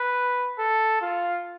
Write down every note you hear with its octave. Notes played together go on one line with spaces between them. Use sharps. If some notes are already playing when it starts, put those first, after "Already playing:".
Already playing: B4
A4
F4